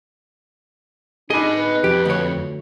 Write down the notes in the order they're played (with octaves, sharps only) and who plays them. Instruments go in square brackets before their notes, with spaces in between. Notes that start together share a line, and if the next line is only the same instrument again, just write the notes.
[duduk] D4 [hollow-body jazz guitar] D#4 G#4 [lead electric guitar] D#5 B5
[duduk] B4
[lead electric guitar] F2 [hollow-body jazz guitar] G4
[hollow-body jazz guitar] D2 C#5